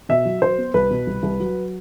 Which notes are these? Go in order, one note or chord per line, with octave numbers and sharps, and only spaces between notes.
B2 E5
F#3
F#3 C5
B3
C2 B4
B2
C2
C2
F#3